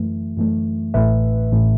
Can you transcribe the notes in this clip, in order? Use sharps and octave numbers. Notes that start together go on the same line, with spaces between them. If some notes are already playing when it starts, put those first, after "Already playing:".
Already playing: F#2 E3 A3
F#2 E3 A3
A1 A2 E3 A3 B4 E5
A1 A2 E3 A3